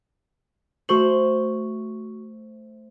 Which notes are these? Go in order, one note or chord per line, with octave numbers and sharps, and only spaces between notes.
A3 F#4 C5 C#6 F#7